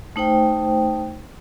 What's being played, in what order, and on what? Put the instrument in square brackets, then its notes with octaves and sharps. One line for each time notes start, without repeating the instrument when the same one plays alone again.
[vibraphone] A3 D#4 C5 G5